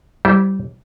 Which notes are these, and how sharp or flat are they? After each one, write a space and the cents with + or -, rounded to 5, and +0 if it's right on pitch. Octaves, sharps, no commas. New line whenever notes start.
G3 -20 E4 +0 C5 +0